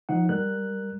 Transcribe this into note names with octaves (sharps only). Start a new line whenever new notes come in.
F3 D#4 F#5
G3 A#4 F#6